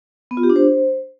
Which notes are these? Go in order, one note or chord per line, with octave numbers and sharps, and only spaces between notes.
B3
F4
G4
D4
C5